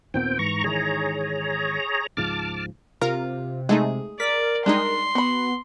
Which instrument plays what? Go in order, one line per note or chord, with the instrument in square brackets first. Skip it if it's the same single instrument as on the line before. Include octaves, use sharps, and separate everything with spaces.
[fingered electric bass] D#2 A#2 B3 [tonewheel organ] C4 G5
[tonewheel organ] G#2 A#5 C#6 [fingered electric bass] E3
[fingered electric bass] G#2 D#3 E3 [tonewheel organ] G#4 C#5 A#5
[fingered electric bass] C#2 G#2 F3 [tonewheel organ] A5 D6 F6
[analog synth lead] C3 [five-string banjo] F4 [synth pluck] A#4
[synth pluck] G#3 A3 D#4 [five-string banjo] G#4
[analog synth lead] A#4 [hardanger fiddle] D5 [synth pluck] B6
[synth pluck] G3 G#3 D#4 [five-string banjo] D4 [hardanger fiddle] C6
[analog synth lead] B3 [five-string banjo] F#4 B5